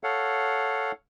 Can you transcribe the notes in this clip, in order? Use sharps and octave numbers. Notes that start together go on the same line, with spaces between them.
A4 C#5 F5 F#5